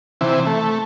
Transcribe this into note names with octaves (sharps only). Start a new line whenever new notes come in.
C3 E3
A3